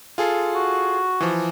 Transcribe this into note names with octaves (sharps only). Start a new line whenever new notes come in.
F4 G#4 A4
F#4
E3 F3